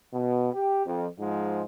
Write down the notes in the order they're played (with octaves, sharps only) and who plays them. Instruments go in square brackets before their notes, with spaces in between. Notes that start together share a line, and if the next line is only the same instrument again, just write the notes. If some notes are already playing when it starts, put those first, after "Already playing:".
[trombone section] B2
G4
F2
G#2 F3 G#3